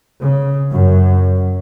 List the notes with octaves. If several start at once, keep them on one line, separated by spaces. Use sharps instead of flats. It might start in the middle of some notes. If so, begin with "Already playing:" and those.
C#3
F#2